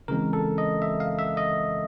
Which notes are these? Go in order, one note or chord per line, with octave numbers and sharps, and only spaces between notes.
C#3 E3 G#3 C4 A#4
A4
D#5
E5
F5
E5
D#5